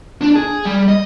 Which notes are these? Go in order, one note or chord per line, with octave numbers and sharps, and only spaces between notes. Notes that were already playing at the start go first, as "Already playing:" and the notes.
D4
G#4
G3
D#5